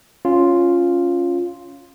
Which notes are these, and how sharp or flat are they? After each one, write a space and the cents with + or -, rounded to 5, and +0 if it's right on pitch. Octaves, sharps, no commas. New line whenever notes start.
C#4 +0 F4 +0